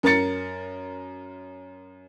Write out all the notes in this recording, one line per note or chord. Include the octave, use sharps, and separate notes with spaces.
F#2 A#4 A#5 A6 C#7